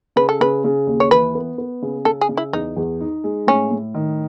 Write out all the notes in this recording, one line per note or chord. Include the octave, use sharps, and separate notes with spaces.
C#3 B4
A4
C#3 B4
C#3
D#2
C#5
E3 B4
B3
B3
C#3
C#3 A4
G#4
C#3
E4
E2 D#4
E2
D#4
G#3
A2 C#4
A2
D#3